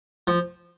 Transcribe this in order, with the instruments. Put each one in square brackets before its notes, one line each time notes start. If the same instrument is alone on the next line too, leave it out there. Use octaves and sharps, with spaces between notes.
[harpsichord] F3